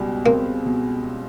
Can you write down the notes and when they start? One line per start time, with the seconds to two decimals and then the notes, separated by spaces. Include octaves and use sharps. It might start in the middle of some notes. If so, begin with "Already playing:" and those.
Already playing: C#2 B2 G3
0.26 A#3 C4
0.66 B2